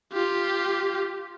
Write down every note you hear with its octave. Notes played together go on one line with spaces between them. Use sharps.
F4 G4